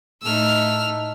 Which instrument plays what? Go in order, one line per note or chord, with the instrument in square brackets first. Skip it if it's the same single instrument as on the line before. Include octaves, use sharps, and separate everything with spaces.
[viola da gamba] A2 A3 D#4 [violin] E6 F6